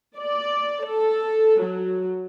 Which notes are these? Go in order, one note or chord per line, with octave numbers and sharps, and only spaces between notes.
D5
A4
F#3